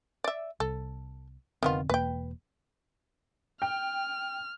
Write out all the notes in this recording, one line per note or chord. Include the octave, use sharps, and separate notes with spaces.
D5 E5
C2 A4
F1 D3 D#3 B3 C4 F4
E1 A#3 B4 G5
G5 F6